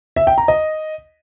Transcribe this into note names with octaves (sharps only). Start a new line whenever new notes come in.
E5
G5
A#5
D#5